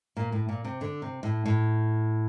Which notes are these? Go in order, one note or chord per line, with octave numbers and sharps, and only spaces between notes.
A#2
A2
A#2
C3
D3
C3
A2
A2